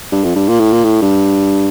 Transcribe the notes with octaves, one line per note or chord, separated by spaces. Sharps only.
G2
F2
G2
A#2
A2
A#2
A2
G2